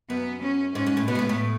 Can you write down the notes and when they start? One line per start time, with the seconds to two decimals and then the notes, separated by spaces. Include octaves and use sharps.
0.10 F#2 B3
0.42 C#4
0.75 G#2 C#4
0.87 G#2
0.97 A2
1.08 B2 B3
1.15 G#2
1.19 A2
1.29 A2